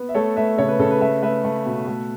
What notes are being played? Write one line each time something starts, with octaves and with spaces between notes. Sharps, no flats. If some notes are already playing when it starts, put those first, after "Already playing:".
Already playing: B3
E5
A3 A4 C#5
A3 B4 E5
C#3 A4 C#5
B4
C#3 A4
B4
A3 B4 E5
A3 B4 E5
A3
B2
A3